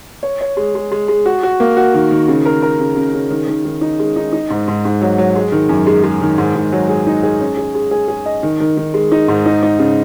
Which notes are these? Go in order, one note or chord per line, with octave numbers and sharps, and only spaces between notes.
C#5
C#5
G#3
G#3
G#3
G#3
F#4
F#4
A#3
F#4
D#3
D#3
C#3
A#4
A#4
C#3
C#3
C#3
D#3
D#3
D#3
D#4
G#3
D#4
D#4
G#2
G#2
G#2
F#3
F#3
G#3
D#3
F#2
G#3
G#3
D#3
G#2
G#2
F#3
G#4
D#4
G#4
C#4
G#4
G#3
G#4
G#4
D#5
D#3
D#3
D#3
G#3
D#4
G#2
D#4
D#4
C#3